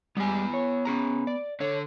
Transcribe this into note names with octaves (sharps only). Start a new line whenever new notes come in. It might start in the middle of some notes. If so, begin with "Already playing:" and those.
G3 G#3 B3 G4 G#5
C#5
C#4 G#4 A#5
D5
D3 C#5